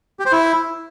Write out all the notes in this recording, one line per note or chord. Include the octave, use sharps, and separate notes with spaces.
G4
C5
E4